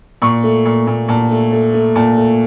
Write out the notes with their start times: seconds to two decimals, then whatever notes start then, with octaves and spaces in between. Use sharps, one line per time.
0.22 A#2 C#6
0.44 A3
0.65 A#2
0.87 A#2
1.09 A#2 A5
1.31 A3
1.53 A3
1.74 A3
1.96 A#2 A5
2.17 A3